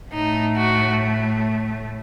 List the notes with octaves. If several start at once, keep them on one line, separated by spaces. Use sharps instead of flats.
A2 A3 D#4
F#4